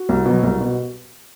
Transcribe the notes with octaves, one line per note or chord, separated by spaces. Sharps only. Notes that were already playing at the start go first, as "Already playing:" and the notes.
Already playing: F#4
C2
B2 F#3
C2
B2